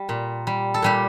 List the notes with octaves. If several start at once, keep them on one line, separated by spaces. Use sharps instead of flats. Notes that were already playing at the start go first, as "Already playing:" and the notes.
Already playing: G3
A#2
G3
A4
A#2 G3 G4